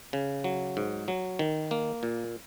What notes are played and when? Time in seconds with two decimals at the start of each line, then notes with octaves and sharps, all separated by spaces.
0.13 C#3
0.44 F#3
0.77 G#2
1.08 F#3
1.39 D#3
1.71 A#3
2.03 A#2